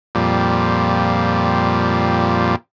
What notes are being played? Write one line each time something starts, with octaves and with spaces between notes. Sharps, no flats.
F2 A#2 G3